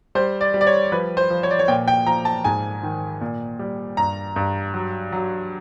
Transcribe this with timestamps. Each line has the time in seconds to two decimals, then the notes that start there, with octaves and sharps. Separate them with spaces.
0.15 G3 C5
0.41 D5
0.54 G3
0.61 D5
0.67 C#5
0.92 F3 B4
1.17 C5
1.30 F3
1.43 C#5
1.51 D5
1.59 C#5
1.68 A#2 G5
1.88 G5
2.06 F3 A#5
2.25 A5
2.44 G#2 G#5
2.83 D#3
3.21 A#2
3.59 G3
3.97 G2 A#5
4.36 G2
4.74 F#3
5.12 F#3